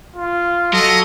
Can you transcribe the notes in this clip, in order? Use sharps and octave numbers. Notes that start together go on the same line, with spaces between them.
F4
F#3 A4 D#5